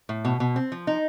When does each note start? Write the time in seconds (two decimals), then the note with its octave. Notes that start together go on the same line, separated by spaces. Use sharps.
0.09 A2
0.25 B2
0.40 B2
0.56 C4
0.72 F3
0.87 D#4